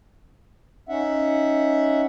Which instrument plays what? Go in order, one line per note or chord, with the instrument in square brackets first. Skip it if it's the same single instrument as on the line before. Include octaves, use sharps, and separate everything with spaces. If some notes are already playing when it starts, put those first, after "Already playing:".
[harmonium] C#4 D#4 E5 F#5